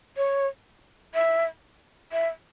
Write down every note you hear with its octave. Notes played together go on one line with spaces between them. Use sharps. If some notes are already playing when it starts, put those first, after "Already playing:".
C#5
E5
E5